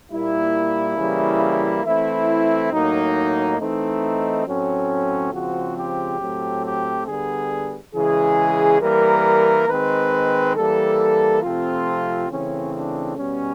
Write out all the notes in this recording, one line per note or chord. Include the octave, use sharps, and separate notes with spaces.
A#2 G3 A#3 E4
C#3 E3 G3 A#3
E3 A3 C4 E4
A2 F#3 A#3 D#4
E3 A3 C4 D#4
A2 F#3 A3 C4 C#4
C#3 F3 G#3 C4 F#4
G4
A2 F#3 A3 C4
G4
D3 G3 B3 G#4
C#3 E3 G#3 G#4
E3 G3 A#3 A#4
D#3 G#3 C4 B4
E3 G3 A#3 A4
C3 F3 A3 C4 F4
C#3 E3 A3 C4 C#4
D4
B2 G3 B3 C#4